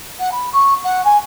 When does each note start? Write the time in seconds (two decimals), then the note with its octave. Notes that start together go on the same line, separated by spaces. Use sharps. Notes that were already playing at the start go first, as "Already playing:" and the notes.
0.19 F#5
0.31 B5
0.53 C#6
0.83 F#5
1.04 G#5